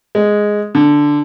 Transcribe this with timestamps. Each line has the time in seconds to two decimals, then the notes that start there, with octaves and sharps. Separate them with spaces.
0.15 G#3
0.75 D3